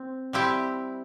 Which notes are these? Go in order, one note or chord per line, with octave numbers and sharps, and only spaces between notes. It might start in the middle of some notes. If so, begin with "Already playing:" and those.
Already playing: C4
G3 C4 E4 G4